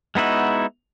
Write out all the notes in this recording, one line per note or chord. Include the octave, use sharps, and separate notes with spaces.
G#3 B3 D#4 E4 F#4